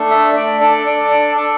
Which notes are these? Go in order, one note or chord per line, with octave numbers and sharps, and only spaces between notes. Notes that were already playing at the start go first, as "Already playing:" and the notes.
Already playing: A3 D4 A4
E5
D5
D4 A4 D5
D5
D5
A4